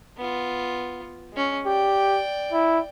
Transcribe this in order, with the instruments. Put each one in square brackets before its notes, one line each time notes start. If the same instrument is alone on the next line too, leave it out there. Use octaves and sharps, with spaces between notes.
[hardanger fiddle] B3 F4
G#3 C#4
[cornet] G4 [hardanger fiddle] D5 G5
[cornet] E4